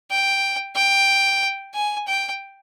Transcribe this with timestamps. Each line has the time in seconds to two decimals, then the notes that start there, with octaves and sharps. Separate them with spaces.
0.11 G5
0.76 G5
1.74 G#5
2.08 G5